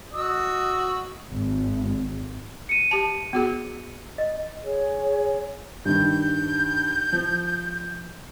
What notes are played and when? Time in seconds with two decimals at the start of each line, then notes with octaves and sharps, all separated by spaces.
0.13 F#4 D#5 E6
1.32 G#1
2.69 C#7 D#7
2.91 G4 A5
3.33 B3 F#4 G#4
4.18 D#5
4.64 G#4 C#5
5.85 G2 D#3 G6
7.12 F3